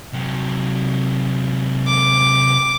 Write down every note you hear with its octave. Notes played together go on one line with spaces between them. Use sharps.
C3 F#3
D6